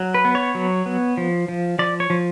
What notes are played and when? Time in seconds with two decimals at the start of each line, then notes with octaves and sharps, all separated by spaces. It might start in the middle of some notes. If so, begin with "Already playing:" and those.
Already playing: F#3
0.14 B4
0.25 B3
0.35 C#5
0.55 F#3
0.86 B3
1.17 F3
1.48 F3
1.79 F3 D5
2.00 C#5
2.10 F3